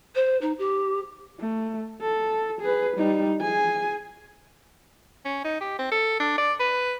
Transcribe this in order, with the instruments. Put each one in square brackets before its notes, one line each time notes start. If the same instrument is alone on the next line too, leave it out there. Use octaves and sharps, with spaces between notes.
[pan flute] C5
D#4
G4
[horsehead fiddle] A3
A4
G#4 B4
G3 D#4
G#4 G#5
[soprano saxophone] C#4
D#4
G4
C4
A4
D4
D5
B4